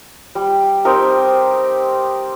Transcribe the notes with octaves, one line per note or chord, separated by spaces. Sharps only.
G3
C4 D#4 G4 A#4